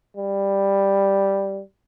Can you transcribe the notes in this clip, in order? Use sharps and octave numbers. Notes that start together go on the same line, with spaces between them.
G3